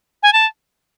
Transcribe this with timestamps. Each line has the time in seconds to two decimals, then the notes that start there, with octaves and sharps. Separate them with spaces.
0.23 G#5
0.33 A5